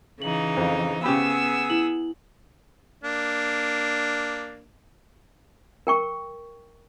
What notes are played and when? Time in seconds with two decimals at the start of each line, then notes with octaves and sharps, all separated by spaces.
0.22 C#3 E3 D#4 F#7
0.57 F2 C5 F5
1.04 C#3 B3 G4 G#4 B5 E6
1.70 E4 F#7
3.04 A#3 D4
5.87 A#4 G5 C#6